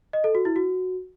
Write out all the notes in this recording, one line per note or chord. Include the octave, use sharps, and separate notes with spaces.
D#5
A4
F#4
E4
F#4